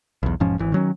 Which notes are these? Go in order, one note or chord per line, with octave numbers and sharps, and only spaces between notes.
B1 E2
E1 G#2 F3 C#4
G#1 E3
D#3 F#3 C#4